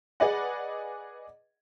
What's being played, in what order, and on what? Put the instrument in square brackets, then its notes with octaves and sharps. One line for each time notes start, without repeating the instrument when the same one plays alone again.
[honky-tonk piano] G#4 B4 D5 D#5 F#5